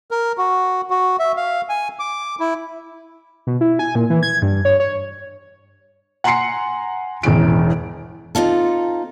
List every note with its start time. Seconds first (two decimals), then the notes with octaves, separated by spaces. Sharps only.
0.11 A#4
0.38 F#4
0.90 F#4
1.19 E5
1.37 F5
1.69 G#5
1.99 D6
2.40 E4
3.47 B2
3.61 E4
3.79 G#5
3.95 A#2
4.10 E3
4.23 G#6
4.42 G2
4.65 C#5
4.80 C#5
6.24 F#5 G#5 A#5 C6 C7 C#7
7.23 E1 A1 E2 D7
8.35 C4 D#4 F4 A4